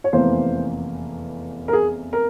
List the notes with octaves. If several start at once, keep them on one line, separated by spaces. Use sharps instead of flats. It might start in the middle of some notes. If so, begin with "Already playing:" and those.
C#5
F1 E2 E3 A#3 C5
A#4
G#4
A#4